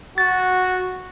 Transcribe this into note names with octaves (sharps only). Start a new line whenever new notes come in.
F#4 A6